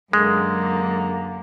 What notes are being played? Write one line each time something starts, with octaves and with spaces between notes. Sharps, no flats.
F#2 D3 G#3 A#3